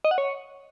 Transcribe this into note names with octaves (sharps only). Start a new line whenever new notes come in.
D#5
F#5
C#5